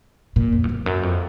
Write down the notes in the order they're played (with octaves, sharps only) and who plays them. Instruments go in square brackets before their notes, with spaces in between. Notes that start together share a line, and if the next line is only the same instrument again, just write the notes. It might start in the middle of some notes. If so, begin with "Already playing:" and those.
[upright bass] A#2
F2
E2
F2
F#2
F2